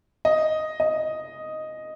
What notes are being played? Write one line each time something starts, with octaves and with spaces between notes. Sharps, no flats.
D#5
D#5